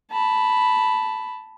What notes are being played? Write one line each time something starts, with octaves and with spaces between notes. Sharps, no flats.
A5 B5